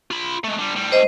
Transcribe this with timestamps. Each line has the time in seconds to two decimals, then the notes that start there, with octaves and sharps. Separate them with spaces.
0.11 F4 B5
0.44 G#3 A3
0.59 D3 G3
0.76 A2 G3
0.92 C5 D#5